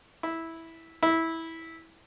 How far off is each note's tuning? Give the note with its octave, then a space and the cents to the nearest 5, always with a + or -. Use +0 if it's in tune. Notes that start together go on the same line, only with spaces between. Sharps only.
E4 -10
E4 -15